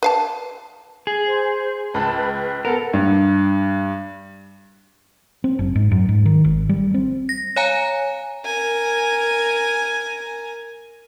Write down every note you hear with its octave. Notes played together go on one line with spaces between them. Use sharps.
B4 F5 A5
G#4
C5
C#2 A5 B5 F#6
B4
B4
B3 A4 A#4 F#5
G2
C4
F#1
G#2
F#2
G#2
D#3
G#1
G3
C4
A#6
C#5 F5 G#5 A#5
A#4 G#5